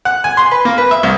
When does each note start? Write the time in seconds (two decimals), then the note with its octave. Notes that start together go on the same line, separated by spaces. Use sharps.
0.05 F#5
0.24 G#5
0.37 C6
0.51 B4
0.65 A#3
0.78 B4
0.91 E5
1.03 C2